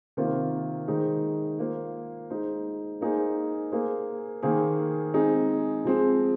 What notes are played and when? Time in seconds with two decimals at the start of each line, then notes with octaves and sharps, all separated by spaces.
0.17 C3 D#3 A#3 F4 C5
0.88 D#3 G#3 D#4 C5
1.59 A#3 F4 C5
2.30 G#3 D#4 C5
3.01 A#3 D#4 G#4 C5
3.72 A#3 G#4 C5
4.42 D#3 A#3 G#4 C5
5.14 G#3 C4 D#4 G#4
5.85 F3 G#3 C4 G#4 C5